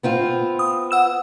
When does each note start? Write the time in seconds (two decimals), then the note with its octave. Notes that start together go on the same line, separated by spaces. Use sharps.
0.03 B3 C4 F4
0.59 D#6
0.91 F#5 E6 E7